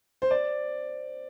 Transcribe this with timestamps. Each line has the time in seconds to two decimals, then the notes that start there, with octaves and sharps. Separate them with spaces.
0.22 C5
0.31 D5